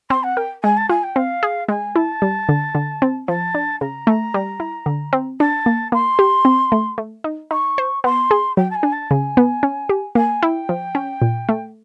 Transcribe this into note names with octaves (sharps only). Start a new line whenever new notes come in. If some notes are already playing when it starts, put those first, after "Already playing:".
C4 C6
F#5
A#4 G5
G#3 G#5
A5
F4 G#5
G5
C4 F5
G#4
G#3 G#5
E4 A5
G3
D3
D3
C4
F3 A5
D4
C#3 A#5
A3
G3
E4
D3
C4
D4 A5
A#3
A#3 C6
G4
C4
A3
A3
D#4
D#4 C#6
C5
B3 C6
G#4
F#3 G5
A5
G#5
D4
A5
C#3 G#5
B3
C#4
G4
A#3 G#5
E4 G5
F3
C#4
A#2
A3